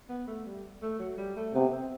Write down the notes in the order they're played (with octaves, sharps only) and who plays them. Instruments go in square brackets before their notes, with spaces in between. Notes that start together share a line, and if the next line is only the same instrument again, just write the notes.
[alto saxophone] B3
A3
G3
A3
F#3
G3
A3
[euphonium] C3 [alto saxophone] B3
[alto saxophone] C4